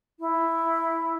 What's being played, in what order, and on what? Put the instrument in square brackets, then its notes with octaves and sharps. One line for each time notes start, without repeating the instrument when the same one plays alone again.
[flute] E4